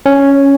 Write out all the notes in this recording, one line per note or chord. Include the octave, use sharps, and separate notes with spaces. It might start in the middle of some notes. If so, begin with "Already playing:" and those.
C#4